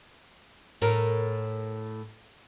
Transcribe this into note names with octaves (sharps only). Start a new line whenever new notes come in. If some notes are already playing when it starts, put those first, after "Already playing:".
A2 A#4